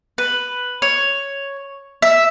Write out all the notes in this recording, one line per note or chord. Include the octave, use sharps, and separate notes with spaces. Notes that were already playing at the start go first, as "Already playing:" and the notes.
B4
C#5
E5